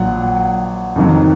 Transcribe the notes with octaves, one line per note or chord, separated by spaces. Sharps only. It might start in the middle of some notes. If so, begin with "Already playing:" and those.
Already playing: A#1 A#2 F#3 F#5
F2 D#3 F#3